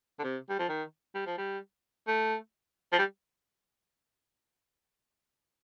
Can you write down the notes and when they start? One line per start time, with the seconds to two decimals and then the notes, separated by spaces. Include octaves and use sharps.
0.19 D3
0.24 C3
0.49 G3
0.59 F3
0.69 D#3
1.15 G3
1.27 F3
1.38 G3
2.07 A3
2.93 F3
2.99 G3